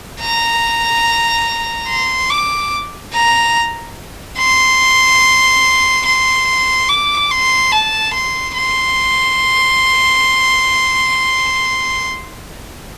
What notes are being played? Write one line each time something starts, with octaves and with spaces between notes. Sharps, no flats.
A#5
C6
D6
A#5
C6
C6
D6
C6
A5
C6
C6